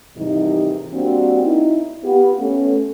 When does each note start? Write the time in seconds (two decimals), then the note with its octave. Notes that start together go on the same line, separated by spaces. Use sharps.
0.17 D#2 G#2 C3 E3 G3 D#4
0.94 G3 A#3 C4 D4 F#4
1.44 D#4 E4
2.04 B3 F4 G4
2.40 A3 B3 C#4